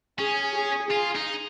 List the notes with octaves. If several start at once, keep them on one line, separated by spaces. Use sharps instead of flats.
C#4 G#4
G#4
F4 G#4
D#4